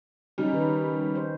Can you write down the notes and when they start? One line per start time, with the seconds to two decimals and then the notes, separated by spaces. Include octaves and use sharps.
0.38 C#3 G3 C#4 D#4
0.53 D#3 B4
1.15 C5